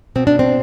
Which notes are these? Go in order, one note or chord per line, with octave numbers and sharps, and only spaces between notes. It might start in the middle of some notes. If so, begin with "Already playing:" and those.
B2 C4
D4
C4